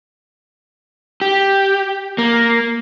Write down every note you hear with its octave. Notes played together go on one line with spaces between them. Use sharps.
G4
A#3